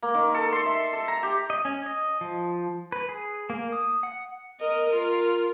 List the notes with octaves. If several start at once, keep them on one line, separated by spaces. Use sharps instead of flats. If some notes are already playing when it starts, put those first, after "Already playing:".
A#3
D#3
A4
C6
E5
A4
A#5
G4
D#5
C#4
D#5
F3
B4
G#4
A#3
D#6
F#5
A#4 D#5
F4 A#4